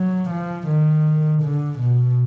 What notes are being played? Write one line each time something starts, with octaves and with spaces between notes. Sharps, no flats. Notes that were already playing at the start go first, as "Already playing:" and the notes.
Already playing: F#3
F3
D#3
D3
B2